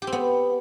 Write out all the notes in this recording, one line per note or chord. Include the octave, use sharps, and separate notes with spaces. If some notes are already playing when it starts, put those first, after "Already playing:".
G4
C4
B3